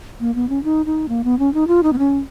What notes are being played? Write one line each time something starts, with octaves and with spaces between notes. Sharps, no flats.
A#3
B3
C#4
D#4
D#4
A#3
B3
C#4
D#4
F4
D#4
B3
C#4